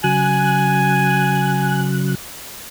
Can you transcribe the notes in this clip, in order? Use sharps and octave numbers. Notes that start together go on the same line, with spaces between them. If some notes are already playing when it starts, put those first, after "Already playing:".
C#3 F#3 G#5 F#6